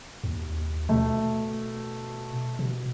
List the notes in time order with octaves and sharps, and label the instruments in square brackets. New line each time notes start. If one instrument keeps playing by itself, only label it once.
[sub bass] D#2
[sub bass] B2 [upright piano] A3
[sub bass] B2